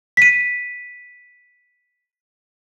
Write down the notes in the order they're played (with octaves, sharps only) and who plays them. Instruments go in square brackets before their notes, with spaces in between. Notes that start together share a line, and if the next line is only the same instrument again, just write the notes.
[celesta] B6 D#7